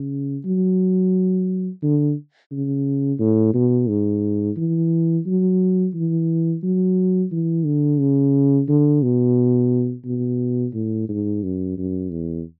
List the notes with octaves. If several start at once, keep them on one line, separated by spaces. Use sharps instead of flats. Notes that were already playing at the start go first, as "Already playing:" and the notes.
Already playing: C#3
F#3
D3
C#3
A2
B2
G#2
E3
F#3
E3
F#3
E3
D3
C#3
D3
B2
B2
A2
G#2
F#2
F#2
E2